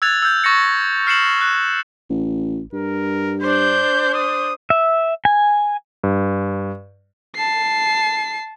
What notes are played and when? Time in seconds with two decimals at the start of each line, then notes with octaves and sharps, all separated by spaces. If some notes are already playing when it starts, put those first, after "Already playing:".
0.02 E6 F#6 G#6 A6 F7
0.22 E6 G6
0.44 C#6 A6 A#6 C#7
1.07 F6 C7 C#7 E7 F#7
1.41 F#6
2.10 A1
2.73 G2 A#4
3.42 D4 C5 G6
4.14 D#6
4.70 E5
5.25 G#5
6.04 G2
7.36 A5 C7